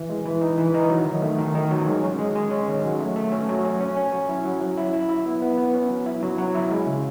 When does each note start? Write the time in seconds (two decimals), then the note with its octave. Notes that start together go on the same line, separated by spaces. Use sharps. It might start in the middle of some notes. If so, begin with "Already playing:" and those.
Already playing: E3
0.10 G#3
0.25 E3
0.41 D#4
0.58 E3
0.74 D#4
0.90 F#3
1.06 D#3
1.22 A3
1.39 D#3
1.55 D#3
1.71 F#3
1.87 G#3
2.03 C#4
2.19 G#3
2.36 G#3
2.51 C#4
2.68 D#3
2.84 F#3
3.00 A3
3.16 A3
3.32 C#4
3.48 F#3
3.65 C#4
3.81 C#4
3.97 C#4
4.13 F#3
4.29 E4
4.45 F#3
4.61 F#3
4.77 E4
4.93 E4
5.09 E4
5.26 B3
5.42 B3
5.58 B3
5.74 C#4
5.90 F#3
6.06 E4
6.23 F#3
6.38 F#3
6.55 E4
6.71 G#3
6.87 C#3